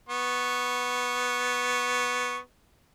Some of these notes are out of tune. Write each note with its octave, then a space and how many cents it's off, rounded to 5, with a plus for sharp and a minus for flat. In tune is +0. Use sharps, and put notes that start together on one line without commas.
B3 +0 C#6 -10